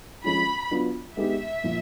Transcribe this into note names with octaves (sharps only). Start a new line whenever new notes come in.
F3 G#3 C#4 F4 B5
F#3 B3 D4 F4
G#3 B3 D#4 G4 E5
A#2 F3